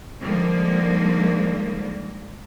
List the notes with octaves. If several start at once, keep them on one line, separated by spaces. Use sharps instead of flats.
D3 D#3 F3 G3 G#3 A#3